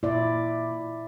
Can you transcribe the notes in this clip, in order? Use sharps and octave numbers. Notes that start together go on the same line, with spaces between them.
A#2 E4 D5